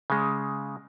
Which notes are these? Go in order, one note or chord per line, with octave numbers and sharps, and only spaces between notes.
C#3 G#3